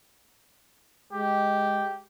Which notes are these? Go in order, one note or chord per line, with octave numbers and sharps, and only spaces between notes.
G#3 G4